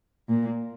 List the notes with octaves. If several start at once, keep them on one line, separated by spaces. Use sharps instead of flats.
A#2